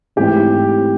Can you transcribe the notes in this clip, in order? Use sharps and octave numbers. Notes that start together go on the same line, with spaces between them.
G#2 E3 A3 C4 G4